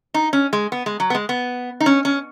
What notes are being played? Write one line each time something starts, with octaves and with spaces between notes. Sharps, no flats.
D#4
C#4
G#3
B3
G#3
F#3
B3
G#3
B3
D#4
C#4
C#4